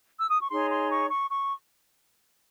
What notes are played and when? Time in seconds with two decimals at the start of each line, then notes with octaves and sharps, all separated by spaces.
0.20 E6
0.30 D#6
0.40 C#6
0.50 D#4 G#4 C#5 C6
0.70 C6
0.90 C#6
1.10 C#6
1.30 C#6